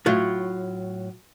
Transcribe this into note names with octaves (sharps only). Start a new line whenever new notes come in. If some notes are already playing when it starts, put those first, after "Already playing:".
A2 F#3 F4